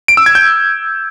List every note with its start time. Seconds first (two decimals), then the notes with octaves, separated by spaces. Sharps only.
0.08 D7
0.17 E6
0.26 G#6
0.35 G6